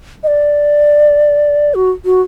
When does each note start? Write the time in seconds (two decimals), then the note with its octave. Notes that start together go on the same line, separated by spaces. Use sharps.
0.23 D#5
0.27 D5
1.75 F#4
2.05 F#4